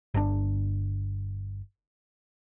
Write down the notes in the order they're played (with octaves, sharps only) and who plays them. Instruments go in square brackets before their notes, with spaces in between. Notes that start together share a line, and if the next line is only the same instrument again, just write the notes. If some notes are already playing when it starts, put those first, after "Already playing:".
[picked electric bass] G1 C#3 D4